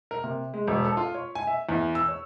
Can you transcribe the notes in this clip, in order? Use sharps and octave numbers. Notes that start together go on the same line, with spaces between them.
A#4
C3
G#3
E1
A4
F4
C#5
G#5
E5
E2
E6
C#5